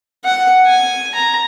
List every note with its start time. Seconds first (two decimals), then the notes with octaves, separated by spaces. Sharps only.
0.25 F#5
0.66 G#5
1.15 A#5